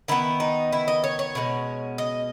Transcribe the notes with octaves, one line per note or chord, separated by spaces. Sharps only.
D#3 G#3 B3 E4
D#4
E4
D#5
C#5
C#5
B2 G#3 C#4
D#5